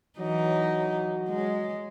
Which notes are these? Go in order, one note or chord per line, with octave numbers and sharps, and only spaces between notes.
E3 F#3 D#4
G#3